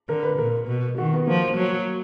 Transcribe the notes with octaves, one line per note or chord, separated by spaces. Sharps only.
D3 A#4
B4
A#2 A#4
B2
D#3 F#4
B3
F3 A#3
F#3